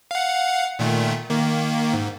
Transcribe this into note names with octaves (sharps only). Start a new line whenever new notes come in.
F5 F#5
A#2 D#3 A3
D#3 A#3
G#2